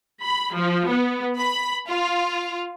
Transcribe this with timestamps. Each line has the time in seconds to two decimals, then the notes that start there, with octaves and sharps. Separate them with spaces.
0.22 B5
0.54 F3
0.87 B3
1.37 B5
1.87 F4